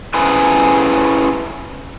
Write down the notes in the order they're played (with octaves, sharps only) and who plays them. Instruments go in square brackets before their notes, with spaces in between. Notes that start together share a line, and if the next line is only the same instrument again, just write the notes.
[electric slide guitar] C#4 E4 G#4 B4 C5